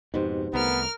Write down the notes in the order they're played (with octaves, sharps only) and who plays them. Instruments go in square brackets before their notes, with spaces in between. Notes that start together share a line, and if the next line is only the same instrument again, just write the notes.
[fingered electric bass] F2 G#2 B2 [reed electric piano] D#4 G4 C5
[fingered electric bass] C2 F#3 A3 [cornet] B3 [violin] A#4 F6